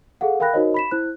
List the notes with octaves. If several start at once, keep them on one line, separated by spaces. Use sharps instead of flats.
G#4 A4 F5 F#5
A#4 F5 G5 B5 F#6 A#6
D#4 F#4 A#4 C5 C#5 D#5
B5 B6 E7
E4 C5 F#6